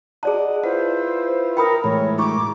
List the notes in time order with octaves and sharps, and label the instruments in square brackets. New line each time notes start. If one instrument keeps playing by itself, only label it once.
[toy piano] G#4 D5 A5 [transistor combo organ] D#5 F#5
[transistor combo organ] E4 F4 B4 [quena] C5 [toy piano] F#5
[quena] A#4 [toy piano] G5 B5 D#6
[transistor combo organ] A2 E3 G#3 [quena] C#5
[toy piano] E4 C#6 [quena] D6